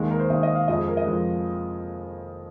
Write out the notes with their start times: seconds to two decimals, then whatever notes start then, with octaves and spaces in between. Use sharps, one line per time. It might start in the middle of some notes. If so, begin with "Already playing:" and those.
Already playing: D#2 D#3 G#3
0.11 A#4
0.20 C5
0.30 D#2 D#3 G#3 D#5
0.43 D#5
0.55 F5
0.68 F2 F3 G#3 D#5
0.78 G#4
0.88 A#4
0.97 D#5
1.06 F2 F3 G#3